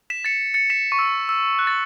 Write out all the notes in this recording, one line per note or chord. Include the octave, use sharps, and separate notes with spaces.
B6 E7
A6 C#7
A6 C#7
B6 E7
C#6
E6
E6
F#6
A6